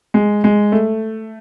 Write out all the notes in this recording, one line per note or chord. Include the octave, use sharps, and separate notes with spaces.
G#3
G#3
A3